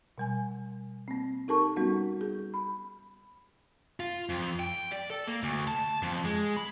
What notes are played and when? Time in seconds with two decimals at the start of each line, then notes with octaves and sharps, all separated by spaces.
0.18 B2 G3 G#5
1.08 A#3 C4
1.48 D#4 G4 A4 A#4 A5 C#6
1.76 G3 B3 C#4 D#4 F#4
2.21 G#4
2.54 B5
4.00 F4
4.29 F2
4.60 G5
4.92 D5
5.10 A4
5.27 A#3
5.43 D2
5.68 A5
6.02 F2
6.25 G#3
6.57 B5